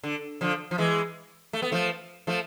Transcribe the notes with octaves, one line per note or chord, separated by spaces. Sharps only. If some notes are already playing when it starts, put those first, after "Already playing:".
D3
D3 F3
F3
E3 G#3
A3
B3
F3 A3
F3 A3